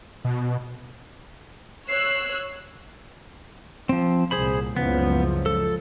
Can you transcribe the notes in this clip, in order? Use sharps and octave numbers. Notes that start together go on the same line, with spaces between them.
B2
C#5 E6 F#6 C7
F3 C4
C2 A#2 G#4 C5 B5
F#1 C#2 F3 B3
A4